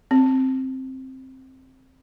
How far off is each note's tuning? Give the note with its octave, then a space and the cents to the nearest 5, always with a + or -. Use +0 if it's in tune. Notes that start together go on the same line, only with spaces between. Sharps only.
C4 +10